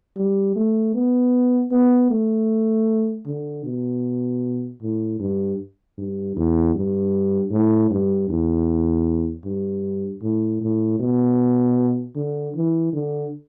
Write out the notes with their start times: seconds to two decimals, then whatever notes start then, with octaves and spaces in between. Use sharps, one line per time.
0.17 G3
0.56 A3
0.95 B3
1.71 B3
2.11 A3
3.26 D3
3.65 B2
4.82 A2
5.19 G2
5.98 G2
6.37 E2
6.75 G2
7.51 A2
7.90 G2
8.29 E2
9.45 G2
10.22 A2
10.62 A2
11.00 B2
12.16 D3
12.55 E3
12.93 D3